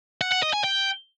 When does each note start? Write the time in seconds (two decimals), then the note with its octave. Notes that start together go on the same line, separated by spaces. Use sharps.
0.21 F#5
0.32 F#5
0.43 D#5
0.53 G#5
0.64 G5